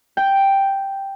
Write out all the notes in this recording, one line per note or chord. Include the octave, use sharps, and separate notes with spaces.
G5